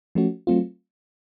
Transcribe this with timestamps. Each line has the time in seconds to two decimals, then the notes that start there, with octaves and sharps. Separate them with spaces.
0.15 F3 A3 C#4 F#4
0.47 F#3 A3 C4 F4